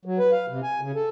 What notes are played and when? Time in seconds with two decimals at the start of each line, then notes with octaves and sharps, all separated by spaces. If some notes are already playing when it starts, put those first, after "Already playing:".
0.05 F#3
0.19 B4
0.32 F5
0.49 C3
0.63 G#5
0.81 C#3
0.95 A4